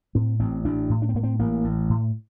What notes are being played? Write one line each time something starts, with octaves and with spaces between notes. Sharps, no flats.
A2 C4
A1 C4
A1 D4
A2
D4
C4
A2 A#3
C4
A1 A#3
A1
A2